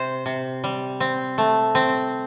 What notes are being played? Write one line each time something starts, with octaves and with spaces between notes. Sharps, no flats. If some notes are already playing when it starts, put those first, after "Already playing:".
Already playing: C3 C5
C3
G3
C4
A3
C4